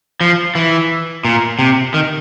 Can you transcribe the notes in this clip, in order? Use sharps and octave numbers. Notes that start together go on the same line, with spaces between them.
F3
E3
A#2
C3
D#3